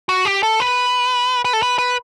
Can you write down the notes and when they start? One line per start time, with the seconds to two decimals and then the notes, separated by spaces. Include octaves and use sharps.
0.09 F#4
0.25 G4
0.43 A4
0.60 B4
1.45 B4
1.53 A4
1.63 B4
1.78 B4